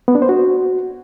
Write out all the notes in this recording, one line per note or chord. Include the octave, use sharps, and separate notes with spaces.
B3
D4
C5
F#4